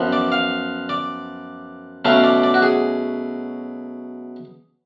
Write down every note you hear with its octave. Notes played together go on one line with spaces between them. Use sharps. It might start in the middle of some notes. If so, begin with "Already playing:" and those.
Already playing: F#2 F3 B3
D5
F5
D5
B2 F#3 A3 C#4 F5
D5
D5
F#4
G#4